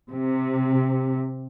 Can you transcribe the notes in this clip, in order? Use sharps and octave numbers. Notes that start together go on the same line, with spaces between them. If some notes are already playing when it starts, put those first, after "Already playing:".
C3